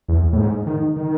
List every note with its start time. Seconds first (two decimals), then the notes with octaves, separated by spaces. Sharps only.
0.08 E2
0.33 A2
0.37 G#2
0.67 D#3
0.96 D#3